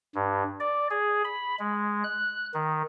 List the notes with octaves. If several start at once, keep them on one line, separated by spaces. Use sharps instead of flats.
G2
D5
G#4
B5
G#3
F#6
D#3